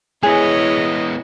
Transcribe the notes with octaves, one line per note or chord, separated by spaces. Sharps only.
G#3 B3 E4 G#4 C#5 D#5